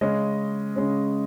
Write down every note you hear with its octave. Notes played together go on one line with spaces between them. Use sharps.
C#3 G#3 C#4 D#5
C#3 G#3 C#4